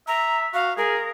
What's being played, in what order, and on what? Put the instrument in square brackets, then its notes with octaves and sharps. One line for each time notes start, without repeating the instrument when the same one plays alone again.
[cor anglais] E5 [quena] A#5
[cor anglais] F#4 [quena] F5
[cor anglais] G#4 [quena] A#4